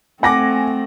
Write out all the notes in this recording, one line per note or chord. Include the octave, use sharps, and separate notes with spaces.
A3 C4 F#5 G#5 D6 A#6